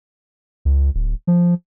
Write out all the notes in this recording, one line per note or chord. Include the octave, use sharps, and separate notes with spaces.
C#2
D1
F3